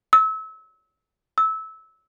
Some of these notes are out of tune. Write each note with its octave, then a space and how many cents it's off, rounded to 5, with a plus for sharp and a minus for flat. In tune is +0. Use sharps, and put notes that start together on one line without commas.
E6 -30
E6 -20